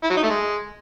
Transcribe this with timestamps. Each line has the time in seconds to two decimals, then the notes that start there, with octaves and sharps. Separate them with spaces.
0.04 E4
0.10 F#3
0.17 D#4
0.23 A3
0.30 G#3